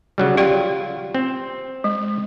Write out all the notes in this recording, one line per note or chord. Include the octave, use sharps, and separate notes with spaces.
C#3 F#3 G3
F4 G4 D5 G5
C4
G#3